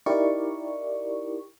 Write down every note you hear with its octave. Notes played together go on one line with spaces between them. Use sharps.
D#4 E4 G4 A#4 D5 C#6